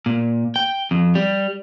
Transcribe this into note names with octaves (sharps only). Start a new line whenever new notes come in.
A#2
G5
F2
G3